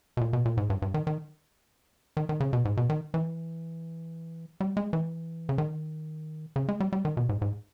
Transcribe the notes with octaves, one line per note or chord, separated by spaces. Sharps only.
B2
A#2
B2
A#2
G#2
G2
G2
D#3
D#3
D#3
D#3
C#3
B2
G#2
B2
D#3
E3
G3
G#3
E3
C#3
D#3
C#3
G#3
G3
G3
D#3
B2
G#2
G#2